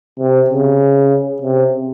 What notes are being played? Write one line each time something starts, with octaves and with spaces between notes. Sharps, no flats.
C3
C#3
C3